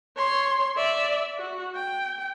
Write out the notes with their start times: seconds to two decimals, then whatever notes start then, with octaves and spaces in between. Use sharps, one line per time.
0.17 C#5 C6
0.77 D5 E5
1.38 F#4
1.74 G5